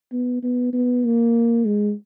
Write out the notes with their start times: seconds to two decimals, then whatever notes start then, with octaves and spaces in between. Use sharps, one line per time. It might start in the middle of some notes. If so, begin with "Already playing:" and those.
0.12 B3
0.43 B3
0.73 B3
1.05 A#3
1.65 G#3